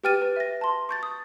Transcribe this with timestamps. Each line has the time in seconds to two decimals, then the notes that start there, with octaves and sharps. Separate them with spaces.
0.04 G4 B4 G5 F6 A6 D#7
0.22 B4
0.36 E5 A#6
0.61 A5 C6
0.89 C#6 G6 A6
1.03 D#6